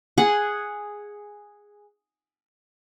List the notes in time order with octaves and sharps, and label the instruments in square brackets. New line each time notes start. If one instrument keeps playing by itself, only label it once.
[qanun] G#4 F#5